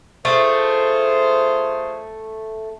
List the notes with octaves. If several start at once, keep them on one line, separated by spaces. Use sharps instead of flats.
A3 F4 G#4 C5